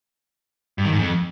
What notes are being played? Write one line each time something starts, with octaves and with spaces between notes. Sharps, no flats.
G2
D#3
G#2
F2